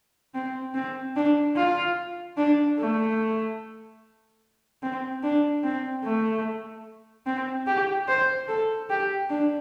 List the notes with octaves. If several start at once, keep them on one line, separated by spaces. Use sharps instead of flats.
C4
C4
D4
F4
D4
A3
C4
D4
C4
A3
C4
G4
C5
A4
G4
D4